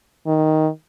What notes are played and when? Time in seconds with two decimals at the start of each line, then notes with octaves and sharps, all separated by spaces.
0.27 D#3